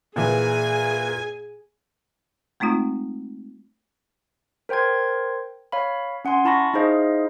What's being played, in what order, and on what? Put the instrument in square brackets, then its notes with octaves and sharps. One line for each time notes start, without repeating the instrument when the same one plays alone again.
[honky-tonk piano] A#2 E3 [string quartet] G#4 G#5 G#6
[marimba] G#3 A3 C4 D#4 F4
[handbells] A#4 C5 G5 C6 G#6
C#5 F5 B5
C#4 F#5 G#5 C6
E4 A5 B5 C#6 A#6
D#4 E4 G#4 C5 D#5 F5